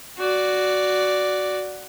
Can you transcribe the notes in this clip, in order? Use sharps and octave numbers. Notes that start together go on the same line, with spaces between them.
F#4 D5